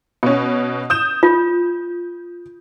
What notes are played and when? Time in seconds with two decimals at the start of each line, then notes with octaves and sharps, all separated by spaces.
0.23 B2 C#4
0.90 D#6 G6 E7
1.23 F4